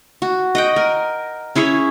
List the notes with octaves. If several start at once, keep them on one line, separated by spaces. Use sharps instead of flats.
F#4
D#5 F#5 G5
A#4
C#4 E4 G#4 C#5